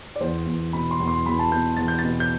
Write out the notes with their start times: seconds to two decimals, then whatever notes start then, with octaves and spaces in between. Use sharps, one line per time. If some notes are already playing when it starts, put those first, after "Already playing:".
0.16 D5
0.20 E2 C5
0.47 E2
0.73 B2 B5
0.91 C6
1.00 E2
1.08 C6
1.26 E2 B5
1.39 A5
1.52 B2 G6
1.77 E2 A6
1.88 G6
1.99 A6
2.04 B2
2.20 G6